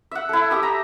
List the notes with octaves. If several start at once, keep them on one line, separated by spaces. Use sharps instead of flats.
E5 F#5
E4 A4
G4 E5 D#6
A#5